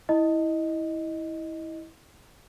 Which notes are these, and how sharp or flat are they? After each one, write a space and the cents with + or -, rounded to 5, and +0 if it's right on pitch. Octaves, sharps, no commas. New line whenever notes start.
E4 -20 D#5 +0